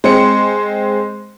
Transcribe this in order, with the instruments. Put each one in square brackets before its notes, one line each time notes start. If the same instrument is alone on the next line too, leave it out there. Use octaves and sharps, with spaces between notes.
[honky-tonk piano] G#3 C4 C5 C#7